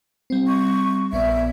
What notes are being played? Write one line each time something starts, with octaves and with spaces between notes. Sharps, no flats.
G3 C4
C#6
A#1 B3 D5 E5